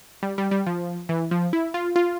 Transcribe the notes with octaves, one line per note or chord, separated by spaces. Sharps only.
G3
G3
G3
F3
E3
F3
E4
F4
F4